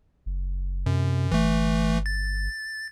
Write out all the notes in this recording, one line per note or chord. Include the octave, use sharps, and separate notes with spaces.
F#1
F#2 C3
G1 E3 A3
A6